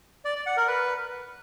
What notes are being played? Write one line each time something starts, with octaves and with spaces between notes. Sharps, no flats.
D5
D5
F#5
A#4
B4